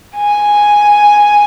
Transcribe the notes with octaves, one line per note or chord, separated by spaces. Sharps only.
G#5